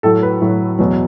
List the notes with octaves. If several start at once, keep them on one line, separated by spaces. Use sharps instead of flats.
A2 F#3 A4
B4
A2 F#3
E2 B2 F#3